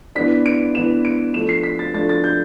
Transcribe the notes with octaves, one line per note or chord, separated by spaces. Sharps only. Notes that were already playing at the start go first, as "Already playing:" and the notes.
E3 B3 D4 B6
D7
E3 B3 D4 E7
D7
F3 A3 D4 E7
C7
B6
A6
F3 A3 D4 A6
A6
G6